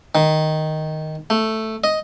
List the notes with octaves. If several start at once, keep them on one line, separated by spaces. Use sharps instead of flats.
D#3
A3
D#5